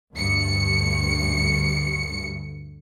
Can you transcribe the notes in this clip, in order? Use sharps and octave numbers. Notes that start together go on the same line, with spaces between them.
D2 G2 C#7